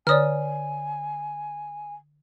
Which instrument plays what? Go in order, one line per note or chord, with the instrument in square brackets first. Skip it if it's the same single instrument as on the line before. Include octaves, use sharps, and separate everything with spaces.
[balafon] D3 C#5 [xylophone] D5 D#6 F6 [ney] G#5